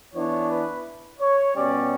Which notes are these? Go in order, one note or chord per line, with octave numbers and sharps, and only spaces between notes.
E3 B3 D4 C#5
B4
C#5
B2 G3 C#4 D5